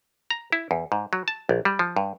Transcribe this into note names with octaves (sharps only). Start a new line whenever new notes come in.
A#5
E4
E2
G#2
F#3
A5
A#1
G3
F3
G2